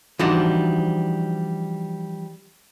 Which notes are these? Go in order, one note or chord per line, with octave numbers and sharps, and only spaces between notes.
E3 F3 G3 D4 D#4 F#4